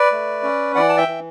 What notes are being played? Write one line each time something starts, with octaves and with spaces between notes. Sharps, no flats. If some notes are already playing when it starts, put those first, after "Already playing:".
Already playing: B4 D5
A3
C#4
E3 D5 F#5
A5
E5 G5
E3